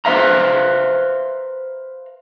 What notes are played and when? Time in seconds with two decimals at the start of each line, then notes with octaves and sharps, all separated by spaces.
0.05 B4 C5 E5 F5 A#5